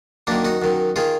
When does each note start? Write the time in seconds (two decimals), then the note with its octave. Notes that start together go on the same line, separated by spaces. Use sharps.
0.27 F#2 D#3 A#3 D4
0.45 D#4 F#4
0.62 F#2 D#3
0.96 D#3 F4 G#4